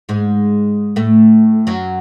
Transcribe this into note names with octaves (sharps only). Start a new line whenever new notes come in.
G#2 G#3
A2 A3
F#2 F#3